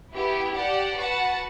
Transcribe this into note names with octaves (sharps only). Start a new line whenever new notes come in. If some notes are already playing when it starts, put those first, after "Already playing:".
B3 E4 G4
G4 D5 F#5 A5
F#4 B4 F#5 A5